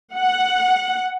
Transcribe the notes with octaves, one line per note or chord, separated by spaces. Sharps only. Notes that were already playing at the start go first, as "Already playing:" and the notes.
F#5